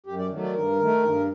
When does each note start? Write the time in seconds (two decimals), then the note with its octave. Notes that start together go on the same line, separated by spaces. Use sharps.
0.06 F#2 G4
0.19 D5
0.31 D#3 F#3 A3
0.43 D5
0.55 G2 A#4
0.80 D#3 A3
1.04 G2